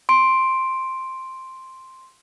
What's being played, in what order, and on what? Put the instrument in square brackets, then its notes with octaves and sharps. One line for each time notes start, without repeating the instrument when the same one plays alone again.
[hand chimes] C6 D7